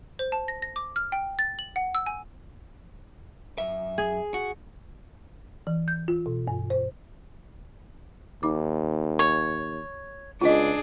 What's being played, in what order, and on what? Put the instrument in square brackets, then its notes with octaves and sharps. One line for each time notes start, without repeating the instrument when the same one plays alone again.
[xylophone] C5
A5
A#6
A#6
D6
F6
G5
A6
F#7
F#5
E6
G#5
[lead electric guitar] F#2 E5
[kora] G#4
[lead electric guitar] F#4
[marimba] E3
G6
F4
B2
G2
C5
[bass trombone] D#2 [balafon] D#4 D6
[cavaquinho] C#5
[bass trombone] C#2 [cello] D4 G#4 [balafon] F4 D#5